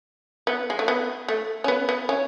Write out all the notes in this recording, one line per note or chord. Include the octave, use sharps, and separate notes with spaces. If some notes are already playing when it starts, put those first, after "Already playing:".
B3
G#3
A3
B3
A3
C#4
B3
B3
C#4